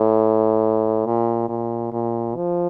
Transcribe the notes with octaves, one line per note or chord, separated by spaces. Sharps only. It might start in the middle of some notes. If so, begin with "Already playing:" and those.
Already playing: A2
A#2
A#2
A#2
F3